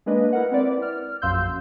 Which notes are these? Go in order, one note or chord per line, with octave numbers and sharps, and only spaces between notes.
G#3 A#3 D4 B4 D#5
E4 A#4 F#5
C4 E4 B4 D5
F6
A#1 F#2 F5 C6 E6 G6